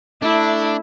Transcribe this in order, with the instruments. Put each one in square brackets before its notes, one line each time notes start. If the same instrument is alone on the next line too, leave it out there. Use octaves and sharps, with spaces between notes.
[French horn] A3 [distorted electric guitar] D4 [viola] E4